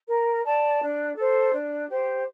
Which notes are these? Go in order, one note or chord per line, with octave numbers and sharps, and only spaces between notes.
A#4
D5 A5
D4
A4 C5
D4
G4 C5